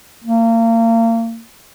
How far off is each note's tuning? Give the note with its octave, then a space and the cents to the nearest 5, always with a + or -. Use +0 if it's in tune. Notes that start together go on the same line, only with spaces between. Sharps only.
A#3 -35